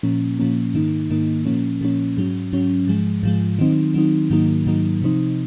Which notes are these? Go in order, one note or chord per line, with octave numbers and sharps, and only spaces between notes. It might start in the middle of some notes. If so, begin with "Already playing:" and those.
A#2 F3 A#3 C#4
A#2 F3 A#3 C#4
G#2 D#3 A#3 D#4
G#2 D#3 A#3 D#4
A#2 F3 A#3 C#4
A#2 F3 A#3 C#4
G#2 F#3 C#4
G#2 F#3 C#4
G#2 F3 G#3
G#2 F3 G#3
D#3 F#3 C4 D#4
D#3 F#3 C4 D#4
G#2 D#3 F#3 A#3 D#4
G#2 D#3 F#3 A#3 D#4
C3 F3 C4 D#4